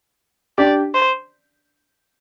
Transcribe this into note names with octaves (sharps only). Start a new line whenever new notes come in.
D4 G4 D5
C5